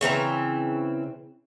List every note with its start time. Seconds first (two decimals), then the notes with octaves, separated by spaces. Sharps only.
0.01 C#3 E3 C4 A#5